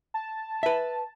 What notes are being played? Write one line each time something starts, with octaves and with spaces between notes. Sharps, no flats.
A5
B4 E5